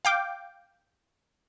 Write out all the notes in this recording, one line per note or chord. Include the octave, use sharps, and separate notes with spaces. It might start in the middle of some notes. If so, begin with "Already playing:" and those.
F5 G5 D6